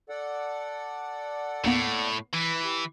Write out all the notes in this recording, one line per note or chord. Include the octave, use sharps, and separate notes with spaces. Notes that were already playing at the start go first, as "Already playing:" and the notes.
A4 D5 F#5
D#2 A2 A#3 B3
E3
G4